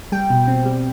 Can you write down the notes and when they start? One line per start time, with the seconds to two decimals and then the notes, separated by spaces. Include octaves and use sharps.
0.12 G3 G5
0.30 B2
0.48 C4
0.65 G3